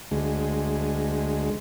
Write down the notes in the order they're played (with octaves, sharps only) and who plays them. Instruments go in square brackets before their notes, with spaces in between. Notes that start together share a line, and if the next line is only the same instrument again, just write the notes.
[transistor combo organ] D2 G#3